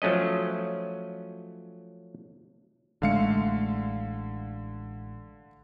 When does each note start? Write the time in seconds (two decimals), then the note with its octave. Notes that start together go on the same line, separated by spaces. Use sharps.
0.02 F3 F#3 A3 C#4 D#5
3.02 A1 D3 G#3 A3 F5 C#7